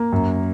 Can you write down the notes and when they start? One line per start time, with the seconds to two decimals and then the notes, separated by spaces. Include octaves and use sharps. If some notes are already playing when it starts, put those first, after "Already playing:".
Already playing: A#3
0.12 F#2